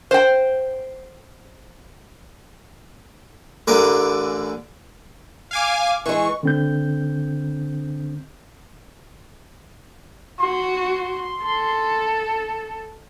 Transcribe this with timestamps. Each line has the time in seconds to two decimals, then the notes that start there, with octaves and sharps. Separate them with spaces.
0.11 C5 G5
3.67 A1 D3 A#4 B4 G#5 D6
5.51 F5 G#5 D6
6.06 E3 G#3 C#6
6.43 D3 C4 G6
10.40 F#4 C6
11.43 A4